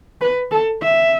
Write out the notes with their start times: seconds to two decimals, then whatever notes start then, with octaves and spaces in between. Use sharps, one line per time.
0.21 B4
0.51 A4
0.82 E5